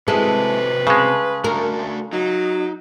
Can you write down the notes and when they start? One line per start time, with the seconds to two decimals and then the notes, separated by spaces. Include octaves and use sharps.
0.08 C3 G#3 C4 E4 F#4 A4 B4
0.87 C#3 G#3 A4
1.44 A3 D4 F#4 A#4
2.13 F#3 D#4